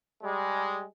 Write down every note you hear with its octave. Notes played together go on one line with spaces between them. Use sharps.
G3 G#3